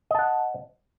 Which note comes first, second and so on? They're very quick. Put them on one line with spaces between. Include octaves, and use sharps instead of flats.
D#5 A5 F#5